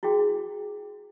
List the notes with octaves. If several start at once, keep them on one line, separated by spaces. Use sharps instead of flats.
E4 F#4 G#4 G5